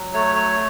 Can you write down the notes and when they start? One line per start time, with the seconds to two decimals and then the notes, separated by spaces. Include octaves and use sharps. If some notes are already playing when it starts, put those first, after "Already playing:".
Already playing: F#3
0.13 A3 C#5
0.36 C#5